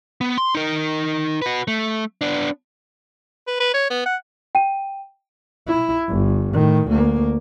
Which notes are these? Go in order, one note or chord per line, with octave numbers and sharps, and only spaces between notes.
B3
C6
D#4 A#4
F#4 B4
A3
B3 D4
B4
B4
C#5
B3
F#5
G5 D#7
E4
G1
A2 D#3
D2 A#3